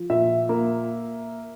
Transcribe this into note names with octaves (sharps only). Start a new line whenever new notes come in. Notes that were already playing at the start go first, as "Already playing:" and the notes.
Already playing: F3
A#2 E5
A#3